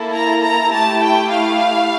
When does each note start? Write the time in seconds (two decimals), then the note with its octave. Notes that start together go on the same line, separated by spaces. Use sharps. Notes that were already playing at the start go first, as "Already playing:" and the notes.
Already playing: A#3 E4 A4
0.13 A#5
0.43 A#5
0.72 A3 E4 G4 A5
1.02 G5
1.31 F5